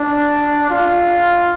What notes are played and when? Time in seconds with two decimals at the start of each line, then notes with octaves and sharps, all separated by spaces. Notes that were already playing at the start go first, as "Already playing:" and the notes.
Already playing: D4
0.70 F4